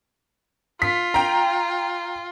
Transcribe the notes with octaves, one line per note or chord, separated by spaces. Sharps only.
F4 B6
G5 A#5